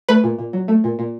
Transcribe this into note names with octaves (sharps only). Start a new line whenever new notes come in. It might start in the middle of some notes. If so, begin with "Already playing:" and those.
A3 B4
A#2
A#2
F#3
A3
A#2
A#2